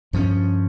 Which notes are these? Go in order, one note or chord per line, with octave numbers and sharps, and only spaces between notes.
G2 F3 C#4